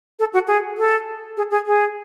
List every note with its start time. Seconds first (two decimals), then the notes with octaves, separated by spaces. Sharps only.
0.19 A4
0.33 F#4
0.48 G#4
0.78 A4
1.37 G#4
1.51 G#4
1.66 G#4